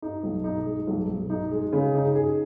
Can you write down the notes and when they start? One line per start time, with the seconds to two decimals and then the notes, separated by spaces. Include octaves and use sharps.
0.02 D#4
0.23 B1
0.44 D#4
0.66 G#3
0.87 B1
1.08 B1
1.30 D#4
1.52 G#3
1.73 C#3
1.95 D#4
2.15 G#4